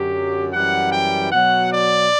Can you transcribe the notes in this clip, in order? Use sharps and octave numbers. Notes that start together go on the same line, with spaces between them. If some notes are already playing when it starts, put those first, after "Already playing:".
Already playing: F#2 D3 F#3 G4
F#2 E3 G3 F#5
G5
B2 F#3 F#5
D5